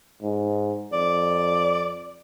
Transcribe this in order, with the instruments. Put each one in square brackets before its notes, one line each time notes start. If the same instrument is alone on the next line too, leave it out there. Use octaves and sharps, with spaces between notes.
[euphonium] G#2
[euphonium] F2 [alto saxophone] D5